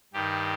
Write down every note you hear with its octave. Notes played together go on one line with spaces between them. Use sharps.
G2 D#3 G4